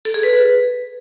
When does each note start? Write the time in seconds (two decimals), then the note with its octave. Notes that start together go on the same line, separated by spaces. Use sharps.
0.05 A4
0.14 G#4
0.23 B4